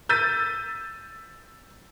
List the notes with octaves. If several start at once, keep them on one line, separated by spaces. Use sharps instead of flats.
E6 G6 A6 B6 D#7